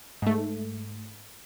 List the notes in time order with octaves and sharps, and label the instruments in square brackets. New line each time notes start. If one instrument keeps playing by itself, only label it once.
[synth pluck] G#2 A3